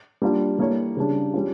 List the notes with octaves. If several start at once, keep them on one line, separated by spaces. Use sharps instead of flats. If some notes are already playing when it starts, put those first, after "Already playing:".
G3 A#3 D4 F4
G3 A#3 E4 A4 C#5
C#3 G3 D4
G3 C#4 F4